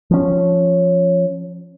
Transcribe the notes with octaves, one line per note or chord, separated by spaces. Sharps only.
F3 C#4